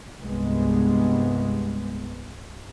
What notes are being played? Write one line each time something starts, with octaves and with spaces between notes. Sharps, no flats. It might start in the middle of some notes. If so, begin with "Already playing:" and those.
C2 G2 G#3 B3